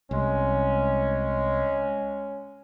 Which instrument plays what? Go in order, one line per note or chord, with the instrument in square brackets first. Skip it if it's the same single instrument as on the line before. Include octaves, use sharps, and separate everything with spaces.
[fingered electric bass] C2 [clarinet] G#3 [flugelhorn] C#4